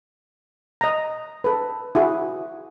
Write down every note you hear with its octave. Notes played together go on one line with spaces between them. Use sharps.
D#5 A#5
A4 B4
E4 F#4 G#4